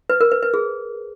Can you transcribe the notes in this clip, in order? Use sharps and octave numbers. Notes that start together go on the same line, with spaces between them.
B4
A#4
B4
B4
G#4